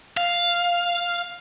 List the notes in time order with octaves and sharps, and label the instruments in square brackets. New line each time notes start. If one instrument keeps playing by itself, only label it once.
[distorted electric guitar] F5